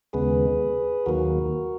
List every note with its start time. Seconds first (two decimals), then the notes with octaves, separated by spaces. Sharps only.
0.13 D#2 C#3 G#3 B3 G#4 B4
1.06 D#2 D#3 F#3 A#3 F#4 A#4